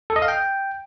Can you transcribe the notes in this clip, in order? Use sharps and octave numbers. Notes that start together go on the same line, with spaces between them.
A4
D#5
F5
G5